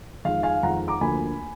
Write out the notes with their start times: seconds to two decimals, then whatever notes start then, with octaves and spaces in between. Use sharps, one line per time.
0.25 F2 D#3 G#3 F5
0.43 F5 G#5
0.63 F2 D#3 G#3 F#5 A#5
0.88 A#5 D6
1.01 D2 D3 F3 A#3 G#5 B5